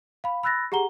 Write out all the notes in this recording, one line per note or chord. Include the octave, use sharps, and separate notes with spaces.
F5 B5
B5 E6 F#6 A6 A#6
G4 G#4 F#5 A#5 G7